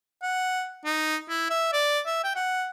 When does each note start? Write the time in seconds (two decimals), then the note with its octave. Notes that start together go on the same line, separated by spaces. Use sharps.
0.22 F#5
0.85 D#4
1.29 E4
1.50 E5
1.73 D5
2.06 E5
2.24 G5
2.36 F#5